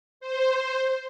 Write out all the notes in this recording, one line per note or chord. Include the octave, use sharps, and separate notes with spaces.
C5